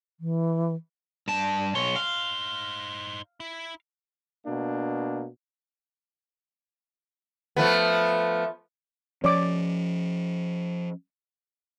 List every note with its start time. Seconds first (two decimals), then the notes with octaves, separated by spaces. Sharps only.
0.20 E3
1.28 G2 A5
1.75 B1 D#4 C5 C#5
1.96 F5
3.40 E4
4.46 B2 A#3 D4
7.56 F3 A3 B3
9.24 F3 C#4 C#5 D5 D6